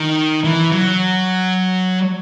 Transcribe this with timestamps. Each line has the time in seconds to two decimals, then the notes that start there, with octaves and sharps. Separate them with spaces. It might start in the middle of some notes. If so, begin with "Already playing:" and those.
Already playing: D#3
0.44 E3
0.72 F#3